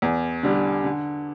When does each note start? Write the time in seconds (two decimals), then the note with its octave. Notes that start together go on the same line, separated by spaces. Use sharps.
0.02 E2
0.43 D3 G3
0.84 D3